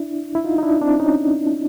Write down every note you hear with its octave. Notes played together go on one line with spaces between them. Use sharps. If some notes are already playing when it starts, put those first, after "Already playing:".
Already playing: D4 E4
E4
D#4 F4
D#4
D4 E4
C4 D4
C#4 D#4